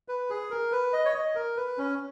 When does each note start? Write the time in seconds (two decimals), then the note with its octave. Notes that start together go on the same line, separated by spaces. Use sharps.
0.08 B4
0.30 G#4
0.51 A#4
0.72 B4
0.93 D#5
1.05 C#5
1.14 D#5
1.35 A#4
1.57 B4
1.78 C#4